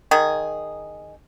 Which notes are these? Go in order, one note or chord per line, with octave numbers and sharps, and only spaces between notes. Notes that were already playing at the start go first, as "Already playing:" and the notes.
D#3 G#4